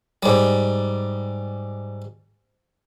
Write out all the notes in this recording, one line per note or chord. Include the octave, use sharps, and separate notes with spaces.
G#2 G3